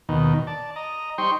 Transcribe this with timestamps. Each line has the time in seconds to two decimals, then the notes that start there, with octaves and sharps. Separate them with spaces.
0.09 D#2 B2 D#3
0.47 D5 A5
0.76 D#5 A#5
1.18 G3 D#4 C5 G5 C6 C#6